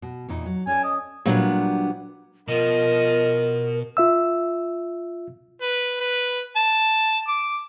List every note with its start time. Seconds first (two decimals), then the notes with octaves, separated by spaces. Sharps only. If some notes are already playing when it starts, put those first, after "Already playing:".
0.02 B2
0.28 E2 A#2 D#4
0.46 F#3
0.67 C#4 A4 D5 G#5
0.84 D#5
1.26 A#2 F#3 G3 B3 D4
2.48 B2 F3 A#4 D#5
3.97 F4 E5 E6
5.62 B4
6.00 B4
6.56 A5
7.28 D6